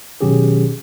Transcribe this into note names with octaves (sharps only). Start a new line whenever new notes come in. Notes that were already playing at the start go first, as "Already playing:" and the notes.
B2 D#3 F#3 C#4 G4 G#4